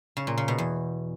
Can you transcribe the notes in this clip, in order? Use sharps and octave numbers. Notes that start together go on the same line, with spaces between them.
C#3
A#2
C#3
B2
E2